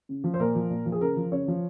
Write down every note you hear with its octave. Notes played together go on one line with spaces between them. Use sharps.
C#3
F3
C5
A#2 A#4
F3
A#2
F3
G#4
C#3 A#4
F3
C#3 C#5
F3